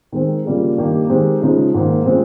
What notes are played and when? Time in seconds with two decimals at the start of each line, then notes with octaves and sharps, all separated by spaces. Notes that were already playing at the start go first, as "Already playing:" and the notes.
0.12 D#3 G#3 C4
0.45 C#3 G3 A#3 F4 G#4
0.77 G2 D#3 A#3 D#4 G4
1.09 D#3 G#3 C4 G4
1.41 C#3 F3 G#3 D#4 G#4
1.74 G#2 D#3 A#3
2.06 C#3 G#3 C4 F4